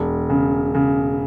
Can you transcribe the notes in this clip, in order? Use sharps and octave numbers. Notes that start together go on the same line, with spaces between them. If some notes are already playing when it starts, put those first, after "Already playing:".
Already playing: E1
C#3
C#3